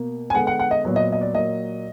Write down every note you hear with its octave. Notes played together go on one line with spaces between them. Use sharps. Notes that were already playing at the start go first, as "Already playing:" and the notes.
Already playing: B2 A#3
G#5
D3 G#3 B3 F#5
F#5
F#5
D#5
A#2 F#3 B3
D#5
D#5
D5
A#2 F#3 A#3 D#5